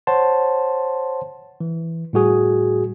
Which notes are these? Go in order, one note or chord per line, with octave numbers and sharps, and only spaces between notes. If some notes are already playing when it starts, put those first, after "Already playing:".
C5 C#5 F#5 A5 C6
E3
A2 G3 F#4 G#4